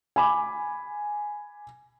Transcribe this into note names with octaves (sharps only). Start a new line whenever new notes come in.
G#5 B5 D6